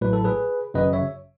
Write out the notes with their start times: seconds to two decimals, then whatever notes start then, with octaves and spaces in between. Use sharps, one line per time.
0.01 A1 A2 F#3 B4
0.13 A4
0.24 G#4 B4
0.74 G#1 F#2 C#3 F#3 B4 D#5
0.93 C#5 E5